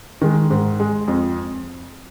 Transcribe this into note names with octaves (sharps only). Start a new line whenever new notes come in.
D#3 G#3
G#2
G#3
F2